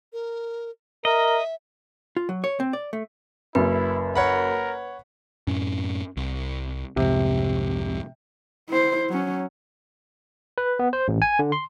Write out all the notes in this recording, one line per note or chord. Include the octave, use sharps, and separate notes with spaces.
A#4
A#4 D#5 E5
F4
F#3
C#5
C4
D5
A3
F#1 F#2 E4 B4
A#4 C#5 F#5 B5
F#2 A2 C#4
C2
C2 F2 G#2 C3
E4 C5
F#3 C#4
B4
B3
C5
A1
G#5
D3
C6